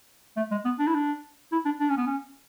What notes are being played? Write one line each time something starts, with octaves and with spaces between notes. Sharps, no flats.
A3
G#3
B3
D4
E4
D4
E4
D4
D4
C#4
B3
C#4